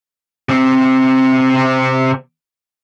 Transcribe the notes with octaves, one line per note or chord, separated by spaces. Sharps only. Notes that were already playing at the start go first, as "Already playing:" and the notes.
C3 C4